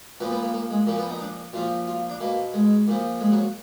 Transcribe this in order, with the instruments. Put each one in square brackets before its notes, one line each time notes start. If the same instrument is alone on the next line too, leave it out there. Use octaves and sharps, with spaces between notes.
[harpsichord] A#2 F3 B3
B3
A#3
A#3
G#3
A#2 F3 A#3
B3
D#4
D4
A#2 F3 F4
F4
D4
B2 A#3
G#3
A#2 F3
G#3
F#3